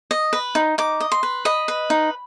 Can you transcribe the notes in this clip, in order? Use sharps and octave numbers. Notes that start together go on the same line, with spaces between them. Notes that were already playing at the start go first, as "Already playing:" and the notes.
D#5
B4
D#4
D#4 D6
D#5
C6
B4
D#5 B5
B4
D#4